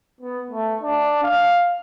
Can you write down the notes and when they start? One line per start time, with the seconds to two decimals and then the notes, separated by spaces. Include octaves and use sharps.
0.21 B3
0.51 A3
0.81 D4
1.23 F5